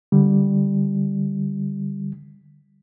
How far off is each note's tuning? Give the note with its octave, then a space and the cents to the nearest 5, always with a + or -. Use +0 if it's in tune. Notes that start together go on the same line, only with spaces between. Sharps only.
D3 +0 G3 +0